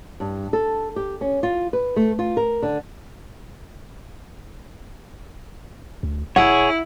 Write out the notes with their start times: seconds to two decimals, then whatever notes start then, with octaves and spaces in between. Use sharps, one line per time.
0.20 G2
0.53 A4
0.96 G4
1.21 C#4
1.43 F4
1.73 B4
1.96 A3
2.19 F4
2.37 A#4
2.62 D3
6.03 D2
6.36 E1 E4 G#4 C#5 F#5